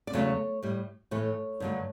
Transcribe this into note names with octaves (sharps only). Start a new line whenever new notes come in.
D5
E2 C#3 F#3 A3 C#5
A2 G3
A2 E3 A3 C#5
G2 D3 F#3 A3